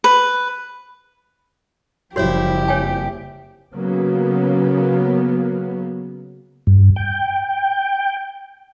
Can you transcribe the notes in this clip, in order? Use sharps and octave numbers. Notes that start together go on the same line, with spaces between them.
B4
F#1 F2 F3 G3 E4 F#4 G4 C#5
C#5 G5 G#5
C#3 F#3 A#3 B3
G2
G5